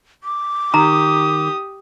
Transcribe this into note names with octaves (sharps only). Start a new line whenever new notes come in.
D6
D#3 G4 A#5 D#6